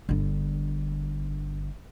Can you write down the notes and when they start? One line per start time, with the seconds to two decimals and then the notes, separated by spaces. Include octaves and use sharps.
0.09 G1 D3